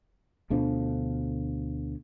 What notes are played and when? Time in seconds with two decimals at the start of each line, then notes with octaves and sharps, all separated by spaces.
0.50 D2 B2 D3 F3